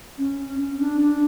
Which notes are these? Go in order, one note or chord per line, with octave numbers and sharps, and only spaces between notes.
C#4
C#4
D4
D4